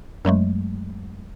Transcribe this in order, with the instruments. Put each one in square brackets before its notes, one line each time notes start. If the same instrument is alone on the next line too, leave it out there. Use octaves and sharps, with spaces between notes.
[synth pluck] F#2 F#3 G#3 A3